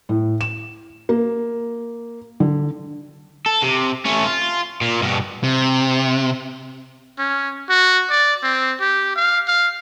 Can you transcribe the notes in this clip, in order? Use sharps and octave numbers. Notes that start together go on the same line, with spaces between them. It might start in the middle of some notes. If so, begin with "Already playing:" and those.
A2
E7
A#3
D3
A4
C3
A3 C#4
F4
A#2
G2 B2
C3
C#4
F#4
D5
C4
G4
F5
F5